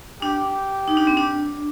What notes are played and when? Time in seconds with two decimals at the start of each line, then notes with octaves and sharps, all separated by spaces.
0.22 D4 G4
0.88 D#4
0.97 D4
1.07 C4
1.17 D4